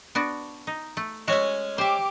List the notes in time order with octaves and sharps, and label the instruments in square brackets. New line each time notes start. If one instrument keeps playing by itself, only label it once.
[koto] B3 D4 F#4
D#4
A3
[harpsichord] G#3 C#4 [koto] F#4 E5
[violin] G4 D6 [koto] C5 E5